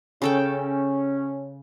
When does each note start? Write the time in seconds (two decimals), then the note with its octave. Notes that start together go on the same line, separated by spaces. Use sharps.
0.22 C#3 C#4 A4 G5